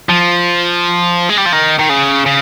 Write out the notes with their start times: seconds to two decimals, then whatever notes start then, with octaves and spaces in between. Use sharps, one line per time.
0.09 F3
1.30 G#3
1.38 G3
1.46 F3
1.53 D#3
1.79 D#3
1.90 C#3
2.26 C#3